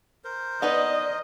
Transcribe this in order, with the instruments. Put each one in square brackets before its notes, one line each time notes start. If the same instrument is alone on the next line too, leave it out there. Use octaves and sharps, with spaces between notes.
[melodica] A#4 C5
[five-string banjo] B3 D#4 B4 [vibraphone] D5 [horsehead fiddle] D#5